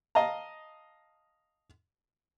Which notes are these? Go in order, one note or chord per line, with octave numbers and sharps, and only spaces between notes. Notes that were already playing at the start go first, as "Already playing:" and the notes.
D#5 F5 A5 A#5